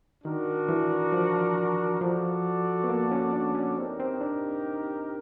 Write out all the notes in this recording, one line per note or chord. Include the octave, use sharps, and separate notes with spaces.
D#3 D4 F#4 A#4
E3
F3
F3 F#4 A4 D5
B3
A#3
C#4
D4
C#4
C4 D#4 G4 A#4
C4
D4